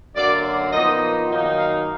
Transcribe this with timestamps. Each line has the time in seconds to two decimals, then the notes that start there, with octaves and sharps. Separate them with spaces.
0.15 F#2 D3 F#3 A#3 D5
0.72 A#2 F3 B3 D#4 D#5
1.29 F#2 D#3 A#3 D#4
1.57 F5